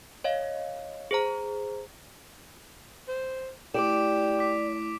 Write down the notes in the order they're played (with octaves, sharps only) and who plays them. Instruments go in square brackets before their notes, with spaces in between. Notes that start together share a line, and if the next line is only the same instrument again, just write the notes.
[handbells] C#5 D#5 F5
G#4 C5 A#5
[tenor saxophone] C5
[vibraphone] A3 E4 [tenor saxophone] G4 [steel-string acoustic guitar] D5 [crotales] D6 D7 E7
[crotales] D6 B6